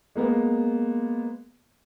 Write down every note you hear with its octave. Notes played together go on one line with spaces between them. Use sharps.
G#3 A#3 B3